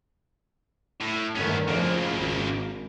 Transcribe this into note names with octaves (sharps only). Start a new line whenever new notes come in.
A2
G1 D#3 A3 B3 C#4
F2 C#3 F3 A#3
G#1